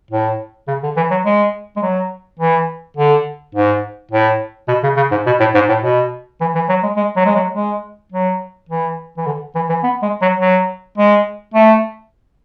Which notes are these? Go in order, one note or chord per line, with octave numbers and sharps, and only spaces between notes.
A2
C#3
D3
E3
F#3
G#3
G#3
F#3
E3
D3
G#2
A2
B2
C#3
C#3
G#2
B2
A2
G#2
A2
B2
E3
E3
F#3
G#3
G#3
F#3
G#3
F#3
G#3
F#3
E3
E3
D3
E3
E3
B3
G#3
F#3
F#3
G#3
A3